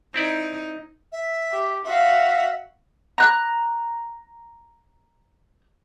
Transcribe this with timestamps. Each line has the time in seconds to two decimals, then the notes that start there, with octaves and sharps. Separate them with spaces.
0.14 C4 D#4 E4 D5
1.12 E5
1.52 G4
1.85 F#4 E5 F5
3.18 A#5 F#6